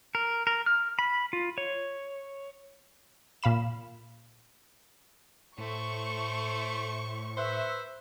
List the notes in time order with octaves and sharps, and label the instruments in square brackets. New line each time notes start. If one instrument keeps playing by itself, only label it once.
[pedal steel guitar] A#4
A#4
F6
B5
F4
C#5
[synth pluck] A#2 F5 B5 E7
[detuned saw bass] A2 [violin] A3 C5 [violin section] C#6
[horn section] B4 C5 E5